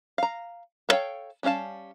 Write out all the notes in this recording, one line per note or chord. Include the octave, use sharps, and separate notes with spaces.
F5 A#5
B3 A4 C#5 F5 G5
G3 C#4 A4 F5 A5